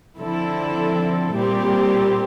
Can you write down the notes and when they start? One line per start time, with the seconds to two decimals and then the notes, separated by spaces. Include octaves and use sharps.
0.18 D3 F3 C4 E4 A4
1.33 A#2 G3 C4 G4